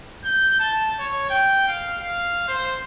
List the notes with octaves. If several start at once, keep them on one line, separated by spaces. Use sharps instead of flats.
G6
A5
C#5
G5
F5
F5
C5